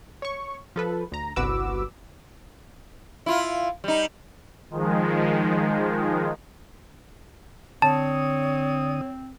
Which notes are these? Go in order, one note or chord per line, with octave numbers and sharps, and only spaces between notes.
C#5 C#6
F3 A4 B4
D2 A#5
G1 C2 F#4 B4 D6 E6
E4 F4
G3 D#4
D#3 F3 G#3
D3 C4 C#5 A5 D#6